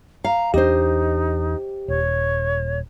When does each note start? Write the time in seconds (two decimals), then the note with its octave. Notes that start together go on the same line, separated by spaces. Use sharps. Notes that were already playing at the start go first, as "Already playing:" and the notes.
0.24 F5 A#5
0.54 E2 D4 D#4 G4 C5 D#5
1.88 D#1 C#5